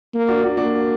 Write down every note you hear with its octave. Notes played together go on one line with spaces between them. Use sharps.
A#3
D4 F#4
D4 F#4
A#3 D4 F#4